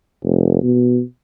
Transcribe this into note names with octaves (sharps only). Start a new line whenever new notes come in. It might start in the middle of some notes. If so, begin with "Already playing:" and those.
F1
B2